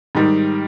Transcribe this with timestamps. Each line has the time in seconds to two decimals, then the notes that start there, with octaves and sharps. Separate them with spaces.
0.15 G#2 D#3 G3